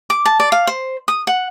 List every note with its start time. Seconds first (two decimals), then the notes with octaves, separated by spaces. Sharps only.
0.10 D6
0.25 A5
0.40 D5
0.52 F5
0.67 C5
1.08 D#6
1.27 F#5